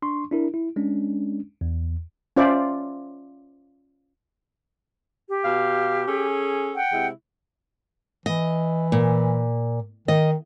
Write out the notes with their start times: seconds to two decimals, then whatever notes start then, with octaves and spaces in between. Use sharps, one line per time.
0.02 D4 C6 C#6
0.31 D4 E4 A#4
0.54 E4
0.76 G#3 C#4 D4
1.61 E2
2.37 C#4 F4 C5 D5 E5 B5
5.28 G4
5.45 B2 F5
6.07 C#4 G#4 A4
6.75 F#5 G5
6.92 C3 G#3 E4
8.26 E3 D#5
8.92 A#2
10.08 D#3 D#5